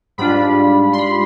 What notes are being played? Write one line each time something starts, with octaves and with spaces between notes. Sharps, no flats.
G#2 G3 D4 F4 B5
C6
B5